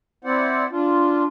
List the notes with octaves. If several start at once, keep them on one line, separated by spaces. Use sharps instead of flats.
C4 E4 C5 D5 F#5
D4 F4